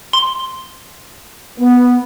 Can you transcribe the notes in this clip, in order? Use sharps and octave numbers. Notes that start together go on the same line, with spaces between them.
C6
B3